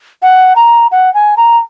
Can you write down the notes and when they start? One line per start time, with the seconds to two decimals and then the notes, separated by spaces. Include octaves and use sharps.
0.22 F#5
0.55 A#5
0.91 F#5
1.14 G#5
1.36 A#5